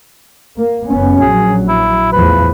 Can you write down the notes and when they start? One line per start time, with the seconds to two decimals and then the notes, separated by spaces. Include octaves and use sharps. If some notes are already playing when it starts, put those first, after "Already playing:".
0.57 A#3
0.87 F#1 B3 C#4
1.21 A#1 F#3 G#4
1.68 E4
2.12 E2 A2 F3 B4